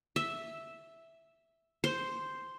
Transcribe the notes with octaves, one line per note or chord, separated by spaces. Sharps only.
E5
C5